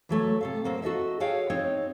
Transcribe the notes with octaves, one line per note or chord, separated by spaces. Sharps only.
E3 F#3 A3 C#5
C3 A4 F5
F#3 A#3 C4
F#4 A4 D#5 E5
F#4 G#4 A4 C#5 F5 G5
C4 D#4 C#5